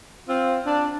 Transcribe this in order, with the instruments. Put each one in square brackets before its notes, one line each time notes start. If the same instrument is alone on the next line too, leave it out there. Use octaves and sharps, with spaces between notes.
[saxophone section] C4 F4
D4